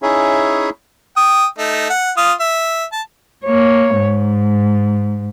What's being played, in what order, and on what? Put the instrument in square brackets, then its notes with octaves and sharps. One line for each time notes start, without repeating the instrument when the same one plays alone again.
[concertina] C#4 D#4 E4 G#4 C#5 E5
[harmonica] G5 D#6
A3 D#4
F#5
F4 F5 D#6
E5
A5
[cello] A#3 C#5
G#2